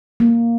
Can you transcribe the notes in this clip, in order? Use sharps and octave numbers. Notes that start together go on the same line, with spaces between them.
A#3